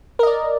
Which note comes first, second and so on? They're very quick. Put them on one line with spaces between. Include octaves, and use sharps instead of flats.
A#4 D#5 D5